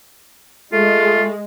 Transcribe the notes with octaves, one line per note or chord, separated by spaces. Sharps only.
G#3 A3 F4